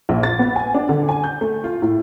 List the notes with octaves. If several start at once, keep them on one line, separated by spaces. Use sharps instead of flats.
A#1
A6
B3
G#5
D4
D3
G#5
G6
A3
F4
A2